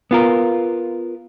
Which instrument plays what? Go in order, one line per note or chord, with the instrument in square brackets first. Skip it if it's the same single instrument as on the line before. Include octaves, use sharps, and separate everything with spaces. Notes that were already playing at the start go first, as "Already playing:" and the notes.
[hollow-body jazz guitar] B3 F4 A#4